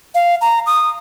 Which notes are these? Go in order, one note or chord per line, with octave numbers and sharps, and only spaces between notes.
F5
A#5
D#6